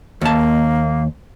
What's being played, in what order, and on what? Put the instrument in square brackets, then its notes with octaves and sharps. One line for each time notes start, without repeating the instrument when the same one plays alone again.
[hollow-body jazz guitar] D#2 A5 [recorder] A#3